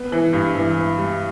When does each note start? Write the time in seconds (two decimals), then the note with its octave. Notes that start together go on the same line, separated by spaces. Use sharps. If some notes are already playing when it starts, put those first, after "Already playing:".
Already playing: B3
0.12 E3
0.33 G2
0.55 E3
0.76 E3
0.98 G3